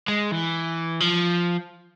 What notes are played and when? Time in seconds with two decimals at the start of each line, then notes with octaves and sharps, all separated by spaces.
0.08 G#3
0.32 E3
1.00 F3